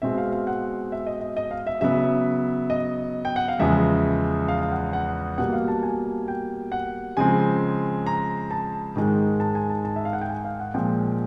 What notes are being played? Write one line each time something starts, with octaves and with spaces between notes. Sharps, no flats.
B2 G#3 C4 E5
F5
F5
F#5
E5
D#5
D#5
D#5
F5
E5
C#3 F#3 B3 E5
D#5
G5
F#5
F5
E2 C#3 F3 G#3 E5
F5
F5
F#5
F#5
B2 G3 A#3 F#5
F5
A5
G#5
G5
F#5
C#3 F3 G#3 C4 G#5
A#5
A5
G#2 D#3 G#3
A5
G#5
A5
A5
E5
F5
F#5
G5
G#5
F5
F#5
A#2 F3 G#3 C4 G5